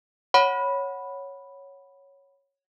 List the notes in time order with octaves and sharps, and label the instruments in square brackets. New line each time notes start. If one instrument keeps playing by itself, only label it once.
[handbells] C#5 F#5 B5